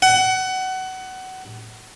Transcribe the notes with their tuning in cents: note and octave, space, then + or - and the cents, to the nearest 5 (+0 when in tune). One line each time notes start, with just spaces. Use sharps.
F#5 +25